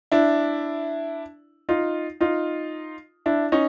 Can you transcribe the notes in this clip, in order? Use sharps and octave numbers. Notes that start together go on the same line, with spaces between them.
D4 E4
D#4 F4
D#4 F4
D4 E4
C#4 D#4